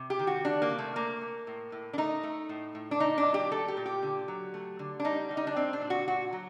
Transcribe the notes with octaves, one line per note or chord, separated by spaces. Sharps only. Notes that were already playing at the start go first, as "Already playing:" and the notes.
Already playing: C3
G4
D#3
F#4
A3 D4
A#3
C3
A3
A3 A#3
A3
A2
A2
D4
A3 D#4
A3
A2
A2
D4
A#2 D#4
D4
F#3
G4
A3 A4
G4
A#2
G4
D3
F#3
A3
D3
D4
G3 D#4
G3
D#4
D4
A#2 C4
D4
A#2
F#4
A#2 F#4
F#3